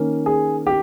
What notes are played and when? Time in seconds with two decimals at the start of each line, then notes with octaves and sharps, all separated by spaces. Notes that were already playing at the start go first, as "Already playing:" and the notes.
Already playing: D#3 A#3 C#4
0.26 G#4
0.67 G4